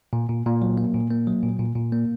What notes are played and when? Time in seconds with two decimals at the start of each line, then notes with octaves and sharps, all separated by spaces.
0.13 A#2
0.29 A#2
0.46 A#2
0.62 F#3
0.77 A#3
0.94 A#2
1.10 A#3
1.27 F#3
1.43 A#2
1.60 A#2
1.76 A#2
1.92 A#3